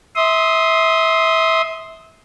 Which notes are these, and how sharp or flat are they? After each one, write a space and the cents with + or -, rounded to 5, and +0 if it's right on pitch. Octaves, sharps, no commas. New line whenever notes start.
E5 -20 C6 +0 D#6 +5